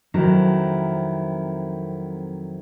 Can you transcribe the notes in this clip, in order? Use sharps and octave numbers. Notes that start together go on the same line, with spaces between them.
F2 D#3 F#3 C4 E4